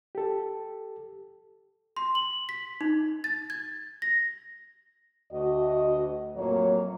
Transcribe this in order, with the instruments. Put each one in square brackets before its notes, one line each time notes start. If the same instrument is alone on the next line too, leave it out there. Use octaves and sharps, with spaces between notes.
[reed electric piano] G4 A4
[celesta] C6
F#7
B6
D#4
A6
G#6
A#6
[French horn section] D2 F#4 D#5
F2 A2 F#3 A3 A#3 C#5